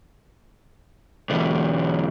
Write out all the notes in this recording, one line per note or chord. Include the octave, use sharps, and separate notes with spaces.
B1 E2